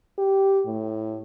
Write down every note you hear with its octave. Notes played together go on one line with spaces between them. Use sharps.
G4
A2